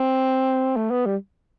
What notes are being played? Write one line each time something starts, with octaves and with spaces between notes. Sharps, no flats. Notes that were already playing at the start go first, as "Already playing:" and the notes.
Already playing: C4
A3
B3
G3